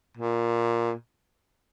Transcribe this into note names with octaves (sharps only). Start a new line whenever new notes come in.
A#2